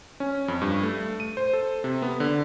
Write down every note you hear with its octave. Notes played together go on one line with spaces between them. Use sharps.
C#4
F2
G2
A3
D#7
C5
A4
C3
B3
D3